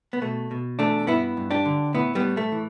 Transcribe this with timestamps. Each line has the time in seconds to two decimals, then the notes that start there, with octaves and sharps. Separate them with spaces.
0.13 B3
0.22 B2 A3
0.51 B2
0.79 E2 A3 D4
1.07 G2 B3 E4
1.37 G2
1.51 D4 G4
1.65 D3
1.94 A2 B3 E4
2.15 G3 B3
2.22 A2
2.37 A3
2.52 E3